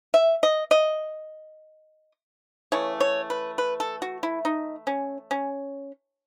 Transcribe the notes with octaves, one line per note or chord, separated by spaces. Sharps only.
E5
D#5
D#5
C#3 E3 A3 C#5
C#5
B4
B4
A4
F#4
E4
D#4
C#4
C#4